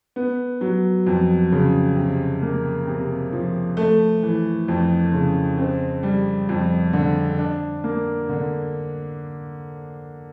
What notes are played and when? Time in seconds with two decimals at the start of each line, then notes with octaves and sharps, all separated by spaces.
0.16 B3
0.61 F#3
1.07 F2
1.52 C#3
1.96 C3
2.42 A#3
2.87 C3
3.32 F3
3.77 A3
4.23 E3
4.68 F2
5.13 C#3
5.58 C4
6.03 G3
6.49 F2
6.93 D3
7.38 D4
7.84 A#3
8.29 D3